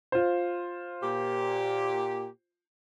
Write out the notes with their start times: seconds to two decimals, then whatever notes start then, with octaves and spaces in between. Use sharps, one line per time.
0.12 F4 C5
1.02 A#2 G4